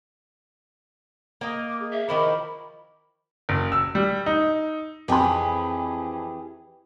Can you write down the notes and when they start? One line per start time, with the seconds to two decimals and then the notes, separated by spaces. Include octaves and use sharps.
1.41 A#3 D#5
1.67 D6
1.79 G#4
1.92 E5
2.09 D#3 F3 E4 A#4 D#5 B5 D6
3.49 F#1
3.72 E6
3.95 G3
4.26 D#4
5.08 F2 E3 G4 G#4 B5